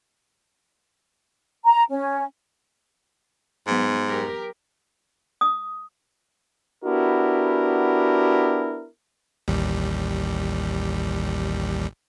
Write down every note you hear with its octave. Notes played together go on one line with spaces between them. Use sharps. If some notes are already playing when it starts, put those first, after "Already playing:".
A#5
C#4
G#2 F#3 B3
G4 A#4
D#6
B3 D4 E4 F#4 G4 A#4
A1 D#2 G3